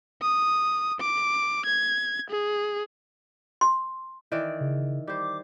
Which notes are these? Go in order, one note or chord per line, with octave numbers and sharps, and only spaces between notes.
D#6
D6
G#6
G#4
C6
D#3 E3 D5
C#3
G3 C5 D6